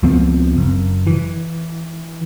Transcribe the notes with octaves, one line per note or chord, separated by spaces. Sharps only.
C#2 F3 B3 C4
F#1
E3